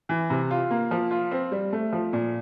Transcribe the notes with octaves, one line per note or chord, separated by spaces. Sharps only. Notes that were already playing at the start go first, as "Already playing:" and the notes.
E3
C3
F4
A#3
F3
F4
C4
G3
A3
F3
A#2